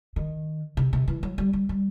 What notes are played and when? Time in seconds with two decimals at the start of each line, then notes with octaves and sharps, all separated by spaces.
0.16 D#3
0.77 C3
0.93 C3
1.08 E3
1.23 F#3
1.38 G3
1.53 G3
1.69 G3